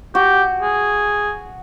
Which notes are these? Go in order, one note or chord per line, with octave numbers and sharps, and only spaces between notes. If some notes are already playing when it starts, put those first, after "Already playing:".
F#4 G4
G#4